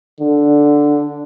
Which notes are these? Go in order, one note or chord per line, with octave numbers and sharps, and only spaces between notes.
D3